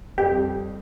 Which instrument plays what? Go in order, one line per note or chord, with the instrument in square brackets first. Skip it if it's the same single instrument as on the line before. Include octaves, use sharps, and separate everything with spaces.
[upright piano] F2 G3 [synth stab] G4